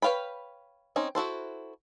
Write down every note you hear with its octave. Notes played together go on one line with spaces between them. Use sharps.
B4 C#5 F5 G5 B5
C4 C#4 D#4
E4 F#4 A4 C5